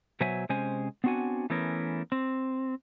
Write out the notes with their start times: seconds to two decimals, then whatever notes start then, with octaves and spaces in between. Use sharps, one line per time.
0.20 B2 F#3 C5 C#5 E5 G#5
0.49 C3 G#3 C#4 C5 G#5
1.04 B3 C4 D4 F#4 F#5 G#5
1.50 E3 A3 B3 C#4 A#4
2.12 C4